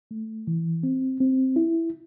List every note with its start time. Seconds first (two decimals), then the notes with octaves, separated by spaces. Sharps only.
0.11 A3
0.47 E3
0.83 C4
1.20 C4
1.56 E4